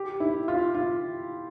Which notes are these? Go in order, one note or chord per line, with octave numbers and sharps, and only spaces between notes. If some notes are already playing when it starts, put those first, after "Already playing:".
Already playing: G4
E4
F4
F4